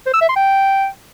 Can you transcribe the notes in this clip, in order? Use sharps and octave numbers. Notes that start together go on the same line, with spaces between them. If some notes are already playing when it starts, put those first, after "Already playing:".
C5
E6
E5
C6
G5